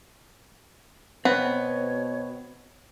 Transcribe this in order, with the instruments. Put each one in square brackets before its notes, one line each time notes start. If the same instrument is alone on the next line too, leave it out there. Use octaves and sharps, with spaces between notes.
[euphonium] B2 [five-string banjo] B3 [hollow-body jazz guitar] C4 [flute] C#5